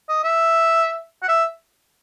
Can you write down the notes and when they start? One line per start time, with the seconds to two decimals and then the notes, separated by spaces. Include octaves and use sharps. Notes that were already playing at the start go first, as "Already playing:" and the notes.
0.09 D#5
0.24 E5
1.23 F#5
1.29 E5